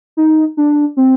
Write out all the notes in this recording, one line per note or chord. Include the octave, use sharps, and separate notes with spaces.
D#4
D4
C4